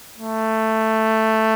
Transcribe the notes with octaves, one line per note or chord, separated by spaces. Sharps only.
A3